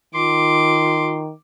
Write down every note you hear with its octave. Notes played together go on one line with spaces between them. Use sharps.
D#3 F4 C6 D6